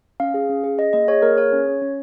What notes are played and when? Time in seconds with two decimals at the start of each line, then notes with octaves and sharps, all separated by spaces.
0.20 C#4 F5
0.34 G#4
0.49 C#4
0.64 G#4
0.78 G#4 D#5
0.93 A#3 D#5
1.08 G#4 C#5
1.22 A#3 A#4
1.37 G#4 C#5
1.52 C#4
1.67 C#4
1.82 C#4